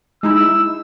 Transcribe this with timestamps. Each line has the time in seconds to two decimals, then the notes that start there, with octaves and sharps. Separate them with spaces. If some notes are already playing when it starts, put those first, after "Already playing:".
0.23 G#3 D#4 E4 E6